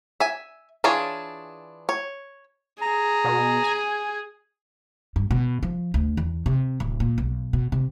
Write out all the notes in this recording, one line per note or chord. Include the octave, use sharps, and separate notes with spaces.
E5 G#5
E3 D4 F4 G#4 C#5
C#5
G#4 A#5
B2
G#5
G2
B2
F3
D2
E2
C3
D1
A#2
B1
B2
C3